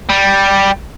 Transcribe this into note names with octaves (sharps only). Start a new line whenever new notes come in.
G3